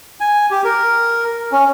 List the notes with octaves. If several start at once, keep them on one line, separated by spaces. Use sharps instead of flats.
G#5
G4
A#4
C#4